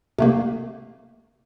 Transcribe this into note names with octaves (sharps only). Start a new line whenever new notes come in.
C3 A3 A#3